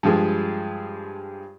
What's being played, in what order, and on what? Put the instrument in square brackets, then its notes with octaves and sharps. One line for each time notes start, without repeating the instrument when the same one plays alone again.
[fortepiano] G2 F3 G#3